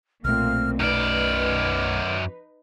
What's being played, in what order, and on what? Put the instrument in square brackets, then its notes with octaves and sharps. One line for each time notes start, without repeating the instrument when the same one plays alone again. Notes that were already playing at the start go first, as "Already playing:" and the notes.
[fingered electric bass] B1 A3 [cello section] A#2 A#3 C4 [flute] F6
[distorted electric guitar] F#2 D5 [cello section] D#4 B4 [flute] F6